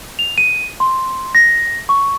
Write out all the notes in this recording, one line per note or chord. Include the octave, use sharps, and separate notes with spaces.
F7
D#7
C6
A#6
C#6